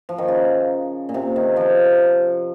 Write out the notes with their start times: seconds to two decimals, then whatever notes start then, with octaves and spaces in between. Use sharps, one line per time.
0.09 F3
0.18 D#3
0.28 C#3
1.09 A#2
1.14 C3
1.36 D#3
1.56 F3